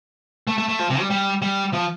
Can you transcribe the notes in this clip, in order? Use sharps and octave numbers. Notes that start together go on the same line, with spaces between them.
A3
A3
A3
F3
C3
G3
G3
G3
F3